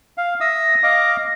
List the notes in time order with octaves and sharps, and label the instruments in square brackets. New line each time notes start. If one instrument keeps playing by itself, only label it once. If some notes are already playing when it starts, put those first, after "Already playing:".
[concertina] F5
[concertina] E5 D#6 E6 [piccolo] A#6
[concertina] D#5 F5 D6